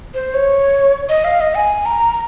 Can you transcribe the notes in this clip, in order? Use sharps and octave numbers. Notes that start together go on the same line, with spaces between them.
C5
C#5
D#5
F5
D#5
G#5
A#5